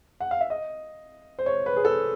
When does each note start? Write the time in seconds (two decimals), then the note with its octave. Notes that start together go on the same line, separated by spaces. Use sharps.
0.20 F#5
0.31 F5
0.41 E5
0.50 D#5
1.39 C5
1.46 C#5
1.66 B4
1.76 G#4
1.85 A4